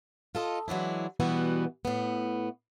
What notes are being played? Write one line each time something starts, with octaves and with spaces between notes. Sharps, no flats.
F4 A4 D#5
E3 F#3 G#3 D4 E4
B2 E3 G3 B3 F#4
A2 B3